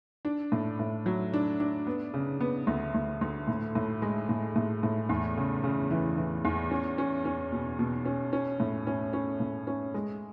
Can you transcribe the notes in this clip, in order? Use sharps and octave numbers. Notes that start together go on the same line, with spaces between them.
D4
A2
A2
F#3
D4
D4
B3
C#3
B3
D2
D2
D2
A2
A2
G#3
A2
A2
A2
E2
C#3
C#3
E3
E3
E2
C#4
C#4
C#4
B2
B2
C#4
C#4
A2
C#4
C#4
A2
C#4
G#3